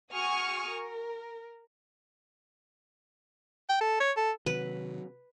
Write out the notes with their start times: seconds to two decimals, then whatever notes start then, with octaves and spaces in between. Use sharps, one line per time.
0.12 F#4 G#4 G#5 C#6 D#6 F6
0.69 A#4
3.69 G5
3.81 A4
4.00 C#5
4.16 A4
4.46 C3 D#3 F#3 C4 B4